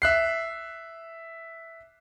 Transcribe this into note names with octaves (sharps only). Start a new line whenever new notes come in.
E5 F#6 C7